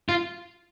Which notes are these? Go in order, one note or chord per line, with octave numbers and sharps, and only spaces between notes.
F4